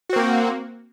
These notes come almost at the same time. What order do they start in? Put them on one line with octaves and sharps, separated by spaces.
F#4 C4 A#3